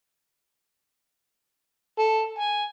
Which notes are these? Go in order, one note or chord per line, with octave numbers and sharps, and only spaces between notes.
A4
G#5